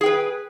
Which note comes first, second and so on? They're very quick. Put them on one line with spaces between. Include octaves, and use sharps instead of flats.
G#4 G5 B4